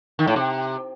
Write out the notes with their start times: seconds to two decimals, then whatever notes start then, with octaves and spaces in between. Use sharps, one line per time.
0.19 D#3
0.27 A2
0.36 C3